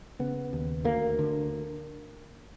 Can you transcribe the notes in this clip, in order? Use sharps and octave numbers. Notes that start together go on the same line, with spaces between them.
C#3 B3
D#2
D2 A#3
D3